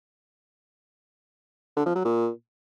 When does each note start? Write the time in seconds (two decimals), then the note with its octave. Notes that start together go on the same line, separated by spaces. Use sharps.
1.76 D3
1.86 F3
1.95 F#3
2.05 A#2